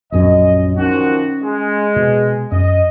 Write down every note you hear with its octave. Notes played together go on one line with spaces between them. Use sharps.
A#1 F#2 C#4 D#5
D#3 F3 C#4 F#4
G#3
B2
F#2 D#5